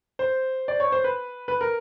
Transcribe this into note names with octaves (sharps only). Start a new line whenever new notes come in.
C5
D5
C#5
C5
B4
B4
A#4